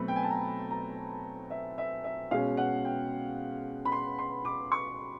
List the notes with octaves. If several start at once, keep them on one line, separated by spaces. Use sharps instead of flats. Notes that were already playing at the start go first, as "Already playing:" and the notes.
Already playing: B2 F#3 A3 C4 B5
G5
G#5
A5
A#5
A#5
E5
E5
E5
B2 G#3 C#4 F5
F#5
G5
B5
C6
C6
D6
C#6